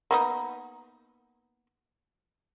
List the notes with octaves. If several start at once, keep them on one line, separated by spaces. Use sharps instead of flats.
A#3 B3 D#4